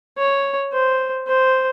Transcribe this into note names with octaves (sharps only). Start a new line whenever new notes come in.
C#5
C5
C5